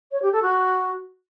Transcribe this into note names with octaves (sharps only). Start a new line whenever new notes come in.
C#5
G4
A4
F#4